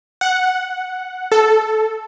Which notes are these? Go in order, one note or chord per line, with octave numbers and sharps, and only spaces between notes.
F#5
A4